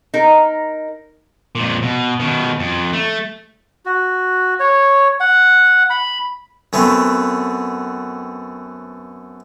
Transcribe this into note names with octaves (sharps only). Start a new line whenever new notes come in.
D#4 A#4
F2 A#2
B2
B2 D#3
F2
A3
F#4
C#5
F#5
B5
F#2 A3 B3 C4